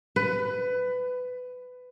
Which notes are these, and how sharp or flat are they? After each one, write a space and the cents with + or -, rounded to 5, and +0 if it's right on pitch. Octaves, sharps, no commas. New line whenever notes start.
B4 +20